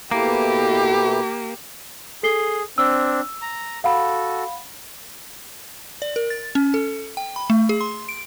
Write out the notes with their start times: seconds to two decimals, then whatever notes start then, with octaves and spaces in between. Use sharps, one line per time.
0.11 B2 A3 A#3 E4 G4
2.23 G#4 A4 C7 G7
2.78 C4 D4 E6
3.42 A#5
3.84 F#4 A4 F5 F#5 B5
6.02 D5
6.16 A#4
6.30 A6
6.55 C#4
6.74 A4
7.17 G5
7.36 B5
7.50 A3
7.69 G#4
7.81 C6
8.09 D7